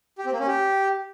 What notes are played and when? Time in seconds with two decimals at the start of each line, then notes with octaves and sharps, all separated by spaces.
0.18 G4
0.25 C4
0.33 A#3
0.40 C#4
0.47 G4